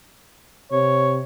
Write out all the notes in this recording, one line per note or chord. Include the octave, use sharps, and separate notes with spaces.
C3 C#5